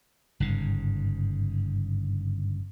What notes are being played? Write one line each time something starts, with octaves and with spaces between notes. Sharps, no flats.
G1 G#2 C#3